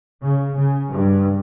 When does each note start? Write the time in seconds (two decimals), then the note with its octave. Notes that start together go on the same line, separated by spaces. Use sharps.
0.21 C#3
0.54 C#3
0.89 G2